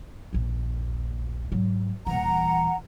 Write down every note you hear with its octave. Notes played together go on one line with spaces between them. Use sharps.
A#1 D#2
G#2 F#3
D#1 E3 F#5 A#5